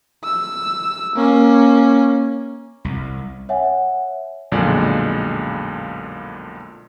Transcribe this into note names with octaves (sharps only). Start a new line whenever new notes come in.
E6
A#3 C#4
C2
C#5 E5 F#5 G#5
B1 F2 A#2 D3 G#3 D5